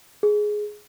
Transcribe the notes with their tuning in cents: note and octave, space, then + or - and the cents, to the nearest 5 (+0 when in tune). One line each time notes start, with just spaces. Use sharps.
G#4 +10